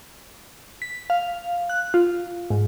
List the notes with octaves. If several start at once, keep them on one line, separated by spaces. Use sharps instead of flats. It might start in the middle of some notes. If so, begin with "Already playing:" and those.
B6
F5
F#6
F4
G#2